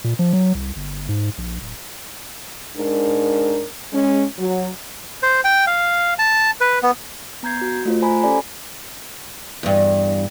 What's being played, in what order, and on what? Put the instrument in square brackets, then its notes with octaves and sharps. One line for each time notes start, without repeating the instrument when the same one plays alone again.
[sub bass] A#2
F3
F#3
C2
G1
G#2
A#1
D1
[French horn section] G#2 D4 A#4
G#3 C#4
F#3
[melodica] C5
G5
F5
A5
B4
B3
[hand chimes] B3 A#5 G6 G#6 C7
F#4
A3 F4 C5
C5 G#5 A#5 B5
C#4 G4 A4 D5 G#5 B5
[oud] E2 G2